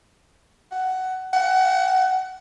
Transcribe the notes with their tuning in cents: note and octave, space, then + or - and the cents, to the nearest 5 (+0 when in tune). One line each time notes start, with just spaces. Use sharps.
F#5 +15
F#5 +25